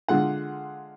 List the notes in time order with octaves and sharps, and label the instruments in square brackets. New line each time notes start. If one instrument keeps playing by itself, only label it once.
[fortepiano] D3 G#3 F4 F#5